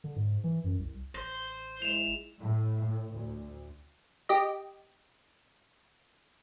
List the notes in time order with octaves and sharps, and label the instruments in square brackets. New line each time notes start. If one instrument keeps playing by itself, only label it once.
[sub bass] D3
G#2
E3
F#2
C2
[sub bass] A1 [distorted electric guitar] C5
[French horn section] G#3 E4 [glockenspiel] E7 F7
[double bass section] A2
D2
[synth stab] G4 D#5